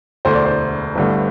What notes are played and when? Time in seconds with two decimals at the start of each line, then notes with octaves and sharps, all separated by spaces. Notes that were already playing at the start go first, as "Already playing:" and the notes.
0.25 E1 D2 D3 A3 C5
0.35 D5
0.45 C5
0.95 G1 G2 D3 A3